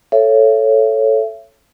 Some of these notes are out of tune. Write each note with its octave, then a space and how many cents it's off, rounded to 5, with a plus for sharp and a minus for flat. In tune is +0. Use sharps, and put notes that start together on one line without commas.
A4 +0 C#5 +0 E5 +35